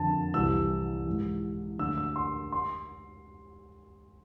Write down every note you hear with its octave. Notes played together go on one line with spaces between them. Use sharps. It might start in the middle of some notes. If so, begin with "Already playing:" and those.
Already playing: F2 D3 A5
C2 C3 E3 E6
G#2 E3
D2 D3 E6
E6
C6
C6